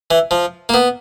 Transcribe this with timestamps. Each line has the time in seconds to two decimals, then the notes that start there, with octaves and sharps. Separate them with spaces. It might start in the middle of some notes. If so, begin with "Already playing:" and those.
0.11 E3
0.31 F3
0.69 A#3
0.74 B3